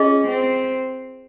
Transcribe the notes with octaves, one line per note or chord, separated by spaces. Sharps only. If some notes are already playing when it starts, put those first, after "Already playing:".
Already playing: C#4 F4 G#4 D#5
C4